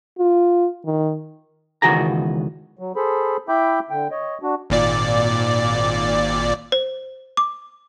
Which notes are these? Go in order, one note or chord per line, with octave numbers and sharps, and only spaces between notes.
F4
D#3
C#2 D#3 E3 F#4 G#4 A#5
F#3
G#4 A4 C5 B5
E4 E5 G5 B5 D6 G6
D3 G5
C#5 D#5
D4 F#4
G#1 A#2 D5
C5
D6